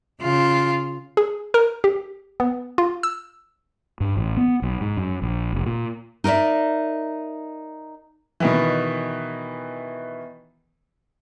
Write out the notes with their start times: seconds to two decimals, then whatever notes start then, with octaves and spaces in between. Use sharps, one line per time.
0.21 C#3 F4
1.17 G#4
1.54 A#4
1.84 G4
2.40 B3
2.78 F4
3.03 E6
4.00 G2
4.17 A1
4.37 B3
4.62 B1
4.81 G#2
4.97 F#2
5.22 A#1
5.53 F1
5.66 A#2
6.24 D#4 A#4 C5 D5 E5
8.40 B2 D#3 E3